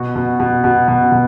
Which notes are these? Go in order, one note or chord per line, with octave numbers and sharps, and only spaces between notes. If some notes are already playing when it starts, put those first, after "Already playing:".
Already playing: B2 F#4
B2
B2
B2
B2
B2